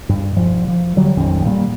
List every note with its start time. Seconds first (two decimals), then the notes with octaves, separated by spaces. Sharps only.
0.09 G2
0.36 E1 F3
0.68 F3
0.96 D3 F#3 G3
1.17 A#1 F2 D#3 C#4
1.45 A#2 G3 A#3